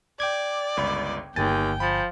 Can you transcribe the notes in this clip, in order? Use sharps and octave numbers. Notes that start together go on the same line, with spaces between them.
D5 G5 D6 G#6
G1 C#2 B5
G1 D#2 G5 G#5 A6
F3 B5